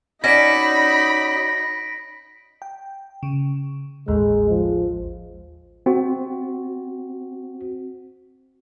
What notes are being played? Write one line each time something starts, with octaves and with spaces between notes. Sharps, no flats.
C#4 D#4 F#4 D5 B5 A#6 B6 D7
G5
C#3
A1 D#2 G#3
F3
C4 F#4